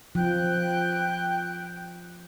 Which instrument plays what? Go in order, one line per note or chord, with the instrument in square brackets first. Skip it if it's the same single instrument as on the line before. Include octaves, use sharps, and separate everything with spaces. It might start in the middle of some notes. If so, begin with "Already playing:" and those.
[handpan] F3 [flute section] G5 F#6